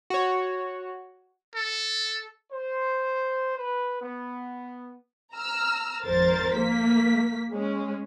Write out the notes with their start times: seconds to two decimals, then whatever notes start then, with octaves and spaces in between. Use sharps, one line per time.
0.10 F#4 C#5
1.55 A4
2.50 C5
3.56 B4
4.00 B3
5.35 A#5 E6 F6
6.04 G#1 F2 A#4 C5 A6
6.56 A#3 B6
7.52 G#3 C#4